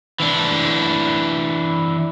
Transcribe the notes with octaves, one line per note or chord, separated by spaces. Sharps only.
E3 D4